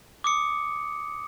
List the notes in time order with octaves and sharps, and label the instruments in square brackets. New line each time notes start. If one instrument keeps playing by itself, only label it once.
[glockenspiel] D6 D#6 C#7